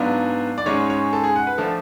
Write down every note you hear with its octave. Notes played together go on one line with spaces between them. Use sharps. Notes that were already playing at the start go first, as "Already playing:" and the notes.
Already playing: G#2 F#3 B3 D4 F5
D5
G#2 G#3 C#4 C#5
C#5
A4
G#4
F#5
B4
F3 A3 D4 A4